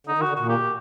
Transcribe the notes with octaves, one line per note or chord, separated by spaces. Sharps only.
D3 D#4
D#3
F#4
D3
A#2 F#4
G4